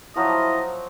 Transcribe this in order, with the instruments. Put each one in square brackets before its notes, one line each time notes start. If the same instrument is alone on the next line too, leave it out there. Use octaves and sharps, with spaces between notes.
[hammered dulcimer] F3 F#3 A5 [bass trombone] E4 [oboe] D#5